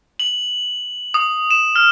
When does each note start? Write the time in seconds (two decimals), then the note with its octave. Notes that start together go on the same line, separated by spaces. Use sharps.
0.20 F#7
1.14 D#6
1.51 E7
1.76 F6